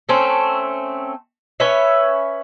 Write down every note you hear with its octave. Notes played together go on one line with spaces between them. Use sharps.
A3 C4 C#4
C#4 B4 C#5 E5